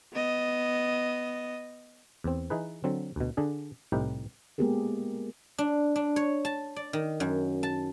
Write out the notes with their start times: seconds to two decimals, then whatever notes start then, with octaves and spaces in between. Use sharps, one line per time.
0.13 B3 D#5
2.24 E2 C4
2.50 E3 D#4 G#4 B4
2.84 D3 F#3 C4
3.16 D2 B2
3.37 D3 D4 G#4
3.92 C2 A2 D#4 G4 B4
4.58 G#3 A#3 B3 G4 G#4 A#4
5.58 D4
5.96 D4
6.16 C#5
6.45 A5
6.76 D5
6.93 D#3
7.20 F#2
7.63 A5